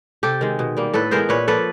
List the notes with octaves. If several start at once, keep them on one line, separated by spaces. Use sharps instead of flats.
C3 G4 A4
D#3 G#3
B2
G3 A#3
A2 A4 B4
E3 G#3 B3 A#4 C5
A#2 B4 C#5
F3 A#3 A4 B4